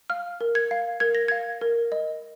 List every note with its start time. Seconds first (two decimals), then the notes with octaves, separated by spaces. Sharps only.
0.10 F5 F6
0.41 A#4
0.55 G#6
0.71 F5
1.00 A#4 G#6
1.15 A#6
1.28 F5 G#6
1.61 A#4
1.92 D#5